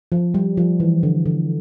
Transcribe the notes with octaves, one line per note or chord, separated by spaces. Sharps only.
F3
G3
F3
E3
D3
D3